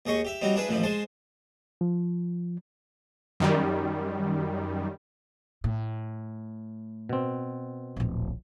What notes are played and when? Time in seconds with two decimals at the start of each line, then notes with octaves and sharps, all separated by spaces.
0.06 D#2 G#4 D#5 C#6
0.25 G4 E5
0.41 F#3 G3 C4 D#4
0.56 D4 E4 G#4 B4
0.69 A1 D#2 F3 E4
0.83 G#3 C5 G#5 A5
1.81 F3
3.40 F#2 D#3 G3
5.64 A2
7.09 B2 C4
7.96 D1 A#1